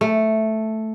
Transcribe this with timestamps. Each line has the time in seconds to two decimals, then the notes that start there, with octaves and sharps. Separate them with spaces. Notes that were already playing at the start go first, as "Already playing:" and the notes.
0.01 A3